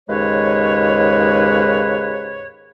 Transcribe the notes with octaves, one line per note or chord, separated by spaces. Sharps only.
D#2 G#2 C#3 G#3 B4 C#5